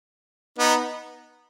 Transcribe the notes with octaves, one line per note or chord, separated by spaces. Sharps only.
B3 D#4